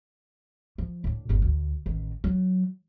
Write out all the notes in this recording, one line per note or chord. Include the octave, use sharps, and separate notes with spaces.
F3
A2 D4
G1 D#2
D2
A1 D#3
F#3